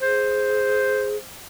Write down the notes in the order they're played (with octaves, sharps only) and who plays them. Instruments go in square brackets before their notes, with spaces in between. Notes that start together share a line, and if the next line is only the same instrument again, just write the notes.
[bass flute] G#4 [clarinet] C5